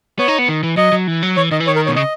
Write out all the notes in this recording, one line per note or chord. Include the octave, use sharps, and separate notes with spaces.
B3 C#5
D#4
B3
D#3
E3
F#3 D#5
F#3
E3
F#3
E3 C#5
D#3 D#5
E3
D#3 C#5
A#4
B2 C#5
C#3 D#5